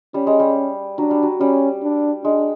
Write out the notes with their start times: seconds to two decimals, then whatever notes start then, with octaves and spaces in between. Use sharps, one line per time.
0.14 G3 C#4
0.27 G#3
0.40 G3
0.98 F#3 D4
1.11 G3
1.23 F#3
1.40 G3 C#4
1.83 D4
2.24 G#3 D4